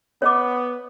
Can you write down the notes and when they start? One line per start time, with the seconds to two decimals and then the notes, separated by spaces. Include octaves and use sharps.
0.22 B3 C#5 D#5 D6